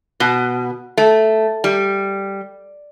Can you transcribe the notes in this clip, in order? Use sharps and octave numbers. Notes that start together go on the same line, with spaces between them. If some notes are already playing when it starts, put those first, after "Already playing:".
B2
A3
G3